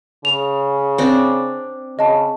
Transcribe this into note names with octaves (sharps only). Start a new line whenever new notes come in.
C#3 F7
C4 D4
C#3 D#5 A5